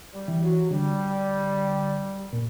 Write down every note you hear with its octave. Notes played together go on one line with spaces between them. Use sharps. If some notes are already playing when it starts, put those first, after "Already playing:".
G3
E3
F#3
D3 G3
A#2